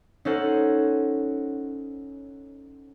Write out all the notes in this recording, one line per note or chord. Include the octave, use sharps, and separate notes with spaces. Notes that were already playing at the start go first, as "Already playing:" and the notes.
C#4 D#4 A4 C5 F#5